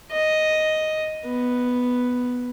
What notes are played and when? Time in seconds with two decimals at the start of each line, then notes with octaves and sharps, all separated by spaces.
0.12 D#5
1.25 B3